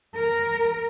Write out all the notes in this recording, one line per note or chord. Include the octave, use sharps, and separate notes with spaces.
A#4